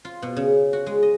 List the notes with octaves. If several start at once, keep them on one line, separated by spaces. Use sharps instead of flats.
F4
B2
C#3
F#4
G#3
D#5